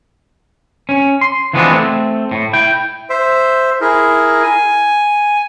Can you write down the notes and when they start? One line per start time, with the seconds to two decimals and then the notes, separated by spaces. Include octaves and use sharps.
0.89 C#4
1.21 C6
1.53 E3 F3 G#3 B3 C4 D4
1.71 A3 C4
2.31 A2
2.53 E4 G5
3.10 C5 E5
3.81 E4 G#4 A#4
4.43 G#5